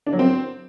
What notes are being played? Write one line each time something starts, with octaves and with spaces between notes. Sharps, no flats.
D4
F#3
C4